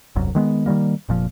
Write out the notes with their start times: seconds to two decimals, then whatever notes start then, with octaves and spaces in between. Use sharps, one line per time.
0.16 E1 C2 F#2
0.35 D#3 G#3 B3
0.66 D#3 F3 G3 A#3
1.09 F1 A#2 F3